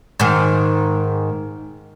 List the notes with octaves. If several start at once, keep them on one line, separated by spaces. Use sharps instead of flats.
G#2 D#3